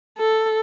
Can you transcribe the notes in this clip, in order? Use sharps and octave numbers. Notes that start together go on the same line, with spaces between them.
A4